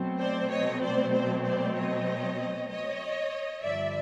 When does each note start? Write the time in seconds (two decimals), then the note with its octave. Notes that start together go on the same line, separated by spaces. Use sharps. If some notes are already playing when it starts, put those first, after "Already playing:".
Already playing: B2 F#3 A3 C4
0.20 C5 D5
0.51 C#5 D#5
0.83 C5 D5
1.13 C5 D5
1.44 C5 D5
1.76 C#5 D#5
2.69 C#5 D#5
3.63 G2 D3 F3 D5 E5